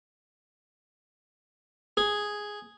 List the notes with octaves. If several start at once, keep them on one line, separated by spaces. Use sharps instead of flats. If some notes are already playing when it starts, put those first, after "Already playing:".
G#4